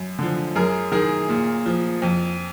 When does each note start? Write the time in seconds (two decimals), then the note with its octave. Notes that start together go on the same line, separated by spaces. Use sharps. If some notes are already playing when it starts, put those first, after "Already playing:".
Already playing: F#2
0.19 D3 F3
0.55 F#2 G#4 A#4
0.92 D#3 G#4 A#4
1.29 A#2
1.66 F3
2.02 F2